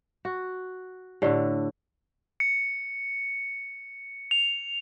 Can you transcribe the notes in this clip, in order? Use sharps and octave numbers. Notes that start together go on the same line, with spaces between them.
F#4
A2 D3 G4 D5
C#7
F7